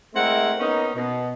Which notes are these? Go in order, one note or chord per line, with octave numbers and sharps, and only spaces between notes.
G#3 A3 C4 E4 A#4 F#5
A#3 B3 C#4 D#4
B2